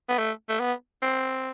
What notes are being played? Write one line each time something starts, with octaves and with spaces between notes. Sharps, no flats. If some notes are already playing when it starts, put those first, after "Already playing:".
B3
A3
A3
B3
C4